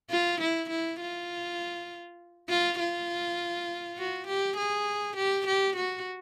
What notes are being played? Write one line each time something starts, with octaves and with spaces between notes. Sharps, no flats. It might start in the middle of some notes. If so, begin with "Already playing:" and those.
F4
E4
E4
F4
F4
F4
F#4
G4
G#4
G4
G4
F#4